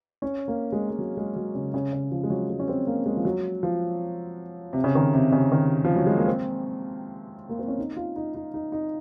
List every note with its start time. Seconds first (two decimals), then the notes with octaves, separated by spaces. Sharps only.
0.22 C#4
0.48 A#3
0.72 G#3
0.90 G#3
0.98 F#3
1.17 G#3
1.36 F#3
1.55 C#3
1.74 C#3
1.93 C#3
2.11 F3
2.23 G#3
2.30 F#3
2.50 G#3
2.59 C#4
2.68 C4
2.87 A#3
3.06 G#3
3.17 F3
3.25 F#3
3.63 F3
4.73 C3
4.84 C#3
4.95 D#3
5.13 C3
5.32 C#3
5.52 D#3
5.84 F3
5.96 F#3
6.07 G#3
6.17 A#3
6.27 C4
7.49 A#3
7.59 C4
7.68 C#4
7.78 D#4
7.96 F4
8.16 D#4
8.35 D#4
8.54 D#4
8.72 D#4